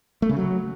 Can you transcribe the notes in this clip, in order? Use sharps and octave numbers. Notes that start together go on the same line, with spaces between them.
A3
C#3
F#3